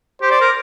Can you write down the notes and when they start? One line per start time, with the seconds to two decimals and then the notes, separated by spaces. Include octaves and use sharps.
0.22 G4 C5
0.31 D5
0.41 A#4